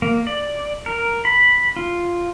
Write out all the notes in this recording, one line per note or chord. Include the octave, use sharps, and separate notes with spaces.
A#3
D5
A#4
B5
F4